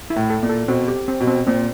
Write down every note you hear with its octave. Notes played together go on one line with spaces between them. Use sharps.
E4
A2
A4
A#2
A4
B2 C4
G4
C4
B2
C4
A#2 C4